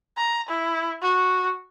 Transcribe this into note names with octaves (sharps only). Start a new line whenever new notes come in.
A#5
E4
F#4